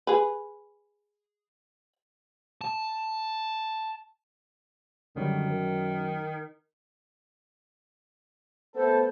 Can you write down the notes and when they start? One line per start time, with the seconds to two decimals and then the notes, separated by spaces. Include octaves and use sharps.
0.07 G#4 B4
2.61 A5
5.16 F#2 D3 D#3 F#3 G3
5.48 A#4
8.75 A3 B3 A4 C5